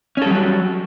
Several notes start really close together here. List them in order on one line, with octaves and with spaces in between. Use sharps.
C#4 A4 G3 F#3 F#4